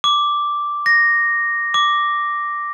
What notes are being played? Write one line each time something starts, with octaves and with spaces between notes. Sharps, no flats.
D6
A#6
D6